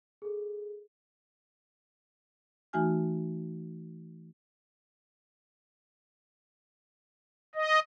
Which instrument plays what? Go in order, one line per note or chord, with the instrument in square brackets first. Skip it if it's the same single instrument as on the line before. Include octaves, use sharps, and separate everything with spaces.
[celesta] G#4 A4
[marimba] E3 A3 D#4 F#4 G#5 F6
[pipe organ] D#5